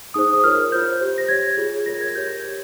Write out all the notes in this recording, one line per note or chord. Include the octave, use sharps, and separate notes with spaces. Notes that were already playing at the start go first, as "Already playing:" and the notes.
D#4 G#4 C5 D#6
D#6
F4 A#4 C#5 F6
F4 C5 G6
G4 C5
A#6
G4 C#5 G#6
F4 G#4 C#5
F4 A#4 C#5 A#6
G#6
G4 A#4 C#5 G6
G4 C5